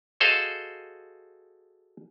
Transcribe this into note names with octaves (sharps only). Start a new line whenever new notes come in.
F#4 G#4 A4 C5 D#5 F5